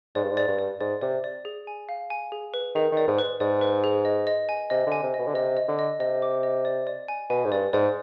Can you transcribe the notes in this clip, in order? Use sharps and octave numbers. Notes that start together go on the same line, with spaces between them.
G#2 D5
G2
G#2
D5
G2
D5
G#2 D5
C3 D5
D5
G#4
G#5
F5
G#5
G#4
B4
D#3 G#4
D#3
D5
G#2
B4
G#2 D5
B4
G#4
D#5
D#5
G#5
C3 D#5
D3
G#5
C3
D#5
B2
D3
C3 D#5
D#5
D3
D#5
C3 D#5
D6
D#5
D5
D5
G#5
B2 G#5
G#2
G2 D5
G#2 D5